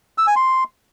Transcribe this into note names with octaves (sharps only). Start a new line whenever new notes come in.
E6
G#5
C6